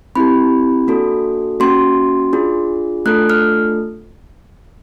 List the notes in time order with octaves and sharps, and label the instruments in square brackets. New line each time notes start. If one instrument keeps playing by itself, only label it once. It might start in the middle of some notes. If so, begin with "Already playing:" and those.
[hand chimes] C4 E4 G4 B5
A#3 D4 F#4 A4
A#3 C#4 F#4 C6
D4 F4 G#4
A3 D4 F4 A4 F#6
F6